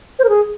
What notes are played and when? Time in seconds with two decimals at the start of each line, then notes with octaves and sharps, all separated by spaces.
0.19 C5
0.24 A#4
0.29 G#4